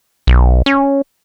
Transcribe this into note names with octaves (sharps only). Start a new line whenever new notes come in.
B1
C#4